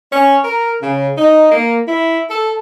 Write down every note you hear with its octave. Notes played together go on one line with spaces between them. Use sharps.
C#4
A#4
C#3
D#4
A#3
E4
A4